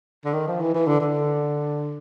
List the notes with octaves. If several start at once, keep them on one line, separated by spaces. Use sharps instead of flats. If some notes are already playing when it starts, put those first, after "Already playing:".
D3
D#3
F3
E3
E3
D3
D3